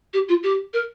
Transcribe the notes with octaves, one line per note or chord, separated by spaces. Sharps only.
G4
F4
G4
A#4